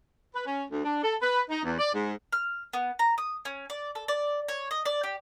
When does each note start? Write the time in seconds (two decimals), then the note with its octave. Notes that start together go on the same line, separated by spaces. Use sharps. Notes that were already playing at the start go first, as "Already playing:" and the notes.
0.34 B4
0.46 C#4
0.70 D2
0.84 D4
1.03 A4
1.21 B4
1.50 D#4
1.64 E2
1.79 D5
1.93 G#2
2.33 F6
2.73 B3
2.99 A#5
3.18 D#6
3.45 C#4
3.70 D5
3.95 A4
4.08 D5
4.48 C#5
4.71 D#5
4.85 D5
5.03 G4